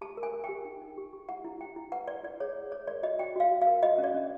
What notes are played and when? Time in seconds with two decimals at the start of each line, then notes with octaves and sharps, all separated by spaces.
0.01 G4 A5
0.17 A#4
0.23 G#5
0.33 A#4
0.44 G5
0.49 G4
0.65 D#4
0.82 D#4
0.98 G4
1.13 G4
1.29 E4 F#5
1.44 E4
1.61 E4 G5
1.76 E4
1.92 B4 F#5
2.08 B4 D5
2.23 E4 D5
2.40 G#4 C#5
2.56 C#5
2.72 C#5
2.87 A#4 D5
3.03 F#4 D#5
3.19 F#4 G5
3.36 F#4 F5
3.51 F#4
3.62 F5
3.67 A#4
3.82 F#4 D#5
3.98 C#4
4.04 D5
4.14 C#4